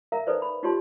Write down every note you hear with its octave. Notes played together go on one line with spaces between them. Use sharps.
A#4 E5 F5 A#5
D#4 A4 B4 C5 D5
B5
D#4 F4 G4 C#5 A5 C6